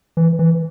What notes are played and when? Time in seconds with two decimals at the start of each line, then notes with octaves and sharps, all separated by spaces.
0.17 E3
0.39 E3